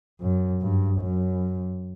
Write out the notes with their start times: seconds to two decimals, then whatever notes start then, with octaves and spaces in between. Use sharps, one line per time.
0.21 F#2
0.61 G2
1.01 F#2